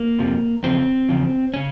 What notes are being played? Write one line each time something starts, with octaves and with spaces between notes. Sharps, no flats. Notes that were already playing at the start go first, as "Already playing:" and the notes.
Already playing: A#3
F2 C3 F3
E2 C#3 F3 C4
E2 C#3 F3
C#3 C#4